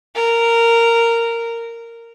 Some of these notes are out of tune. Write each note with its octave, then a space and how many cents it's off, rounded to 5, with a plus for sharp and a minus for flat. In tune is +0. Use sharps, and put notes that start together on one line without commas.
A#4 -10